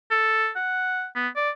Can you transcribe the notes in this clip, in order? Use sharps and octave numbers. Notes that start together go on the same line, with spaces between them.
A4
F#5
B3
D5